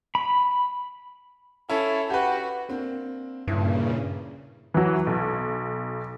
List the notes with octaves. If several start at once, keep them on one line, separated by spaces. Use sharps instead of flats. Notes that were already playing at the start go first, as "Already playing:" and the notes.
B5
C#4 E4 A4
F#4 G4 B4
A#3 C4 D4
G1 G2 A#2 C#3 E4
E3 F#3
B1